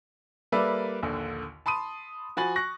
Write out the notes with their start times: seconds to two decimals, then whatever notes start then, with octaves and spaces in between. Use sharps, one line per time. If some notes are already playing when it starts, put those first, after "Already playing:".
0.52 G3 A#3 A4 B4 D5 E5
1.03 A#1 D#2 D3
1.66 A5 B5 C6 D#6 D#7
2.37 F3 F#4 G#5 B5 A6 F#7
2.56 C#6 F#6 A#6